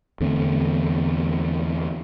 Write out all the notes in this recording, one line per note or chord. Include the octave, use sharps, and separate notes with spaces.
E2 D3 A3 C4